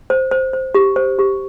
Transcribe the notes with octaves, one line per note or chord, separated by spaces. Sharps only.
C5
C5
C5
G4
C5
G4